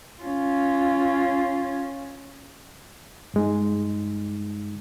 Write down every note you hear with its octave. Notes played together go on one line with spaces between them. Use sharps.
C#4 F4
G2 G#3 D#4